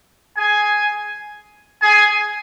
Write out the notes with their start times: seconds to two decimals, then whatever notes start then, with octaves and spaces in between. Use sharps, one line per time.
0.37 G#4 G#5
1.82 G#4 G#5